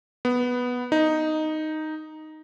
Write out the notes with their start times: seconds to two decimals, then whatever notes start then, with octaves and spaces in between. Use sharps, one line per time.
0.25 B3
0.92 D#4